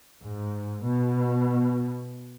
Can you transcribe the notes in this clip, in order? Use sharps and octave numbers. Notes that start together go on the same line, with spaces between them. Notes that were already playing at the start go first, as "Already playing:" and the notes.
G#2
B2